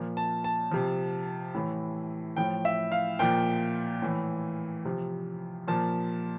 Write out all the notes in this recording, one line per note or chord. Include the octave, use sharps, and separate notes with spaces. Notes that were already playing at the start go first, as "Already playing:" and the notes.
Already playing: A#2 F3
A5
A5
C3 F3
A2 E3
A2 F3 G5
E5
F5
A#2 F3 G5
A2 E3
C3 F3
A#2 F3 A5